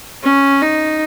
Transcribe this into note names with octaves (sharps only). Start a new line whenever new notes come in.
C#4
D#4